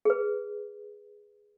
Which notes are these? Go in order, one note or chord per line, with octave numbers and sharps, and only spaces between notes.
G#4 B4